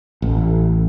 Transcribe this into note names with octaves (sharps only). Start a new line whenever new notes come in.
A1